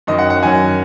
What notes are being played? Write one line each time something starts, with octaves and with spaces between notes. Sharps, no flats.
F#2 D#3 F#3 D#5
F#5
F#5
F#2 D#3 F#3 G#5